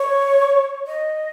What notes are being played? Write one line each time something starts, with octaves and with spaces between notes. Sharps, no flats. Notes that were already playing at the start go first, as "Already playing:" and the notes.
Already playing: C#5
D#5